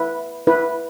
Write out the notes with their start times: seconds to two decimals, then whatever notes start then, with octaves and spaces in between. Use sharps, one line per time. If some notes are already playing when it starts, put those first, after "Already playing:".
Already playing: E4 B4
0.47 E4 B4